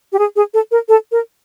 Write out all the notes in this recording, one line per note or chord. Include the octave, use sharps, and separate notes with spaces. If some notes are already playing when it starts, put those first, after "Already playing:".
G4
G#4
G#4
A4
A#4
A4
A#4